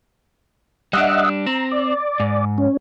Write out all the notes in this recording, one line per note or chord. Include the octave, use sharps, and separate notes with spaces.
G3 D4 D#5 E5 F#5
C4 A#5
D5
G#2
C#4